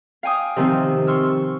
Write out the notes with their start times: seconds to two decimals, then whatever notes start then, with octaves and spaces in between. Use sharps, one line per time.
0.23 F5 G5 G#5 D#6
0.56 C3 D#3 F3 C4
1.07 C6 C#6 E6 F6